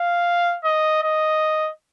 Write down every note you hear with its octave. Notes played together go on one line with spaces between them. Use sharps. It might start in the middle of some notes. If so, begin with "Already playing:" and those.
Already playing: F5
D#5
D#5